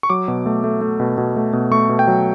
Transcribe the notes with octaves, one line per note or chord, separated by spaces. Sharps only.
C#6
F#3 D6
B2
A3
A3
A3
B2
B2
A3
B2
A3 C#6
B2
G5
F#3